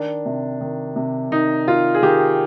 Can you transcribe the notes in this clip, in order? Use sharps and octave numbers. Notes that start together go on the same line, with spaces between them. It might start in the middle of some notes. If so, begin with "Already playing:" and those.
Already playing: D#3 D4
C3
D#3
C3
D#3 D#4
D#3 F4
G#4
D#3 G4